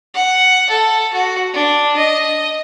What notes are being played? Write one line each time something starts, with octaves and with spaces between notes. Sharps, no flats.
F#5
A4
F#4
D4
D#5